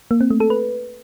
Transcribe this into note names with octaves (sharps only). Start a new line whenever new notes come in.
A#3
C4
A3
A4
B4